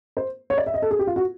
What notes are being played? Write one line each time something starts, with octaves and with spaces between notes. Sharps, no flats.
C5
C#5
D5
E5
D#5
A4
G#4
G4
F4
F#4